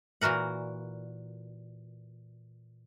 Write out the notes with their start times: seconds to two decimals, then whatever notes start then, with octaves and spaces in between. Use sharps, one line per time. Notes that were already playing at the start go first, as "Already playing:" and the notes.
0.21 A#2 E3 F#4 A#4 F#5